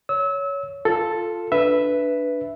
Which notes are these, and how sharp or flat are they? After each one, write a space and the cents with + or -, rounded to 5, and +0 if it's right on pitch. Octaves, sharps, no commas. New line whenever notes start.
C#5 +15 E6 -30
F4 +0 A4 +0
D4 +0 B4 +0 E5 +0